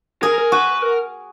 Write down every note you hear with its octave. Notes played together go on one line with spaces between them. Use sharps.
G#4 A#4
A#4
F#4 B4
A#4